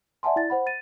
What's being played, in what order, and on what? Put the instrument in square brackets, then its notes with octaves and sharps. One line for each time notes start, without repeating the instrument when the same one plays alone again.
[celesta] D5 E5 F#5 G#5 A5 C6
E4 D5 A6
C5 F#5 B5
A6 D#7